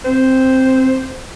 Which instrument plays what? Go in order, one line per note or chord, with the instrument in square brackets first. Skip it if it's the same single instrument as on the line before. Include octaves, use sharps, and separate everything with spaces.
[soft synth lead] C4 [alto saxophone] C5